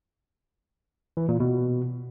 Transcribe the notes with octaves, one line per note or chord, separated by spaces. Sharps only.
E3
A#2
B2